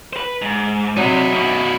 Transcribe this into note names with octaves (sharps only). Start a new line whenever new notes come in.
B4 C5
G#2
C3 F#3 D#4 E4
F#2 B2